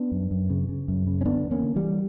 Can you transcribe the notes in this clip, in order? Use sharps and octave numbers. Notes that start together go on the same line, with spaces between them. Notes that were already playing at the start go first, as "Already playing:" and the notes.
Already playing: B3 D4
F#2
F#2
C#3
C#3
F#2
C#3
C#4
D3 B3 D4
E2
A#3 C#4
D3
E3 G3
D3